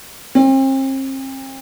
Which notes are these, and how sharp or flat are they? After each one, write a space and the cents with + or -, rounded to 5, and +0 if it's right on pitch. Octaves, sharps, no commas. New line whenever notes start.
C4 +40